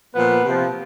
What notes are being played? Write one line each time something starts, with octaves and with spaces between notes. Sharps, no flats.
A#2 F3 B3 B4
C3 F3